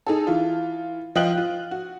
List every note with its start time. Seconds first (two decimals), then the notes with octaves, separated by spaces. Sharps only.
0.07 D#4 G#4 A4
0.27 E3 F4
1.15 F3 D#5 F5 G5 F#6 F#7
1.38 F4
1.71 F#4